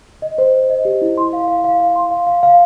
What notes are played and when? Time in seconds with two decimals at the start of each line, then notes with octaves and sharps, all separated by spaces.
0.22 D#5
0.38 C5
0.54 C5
0.70 D#5
0.85 G4
1.02 E4
1.17 C6
1.33 F5
1.48 F5
1.64 F5
1.80 F5
1.96 C6
2.11 F5
2.27 F5
2.43 F5